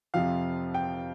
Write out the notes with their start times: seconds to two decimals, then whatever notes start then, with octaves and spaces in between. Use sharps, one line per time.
0.14 F2 C3 F3 F5
0.74 G5